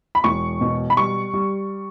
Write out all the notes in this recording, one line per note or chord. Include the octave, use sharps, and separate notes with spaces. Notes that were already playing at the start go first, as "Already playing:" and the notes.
B5
E1 C#6
B2
B5
G3 C#6
G3